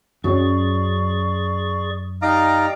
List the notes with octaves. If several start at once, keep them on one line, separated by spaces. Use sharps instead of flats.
F#2 F#3 C#4 G#4 D5 C#6
D#4 G4 D5 F5 G5 A#5